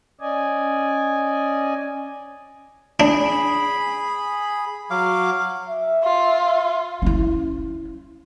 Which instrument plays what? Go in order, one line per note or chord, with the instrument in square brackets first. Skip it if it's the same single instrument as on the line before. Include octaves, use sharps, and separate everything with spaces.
[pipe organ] C#4 D5 D#5 G#5
[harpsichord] D4 [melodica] G#4 B5
[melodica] F#3 F5 D6
[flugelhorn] E5
[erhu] F4
[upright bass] C#4 E4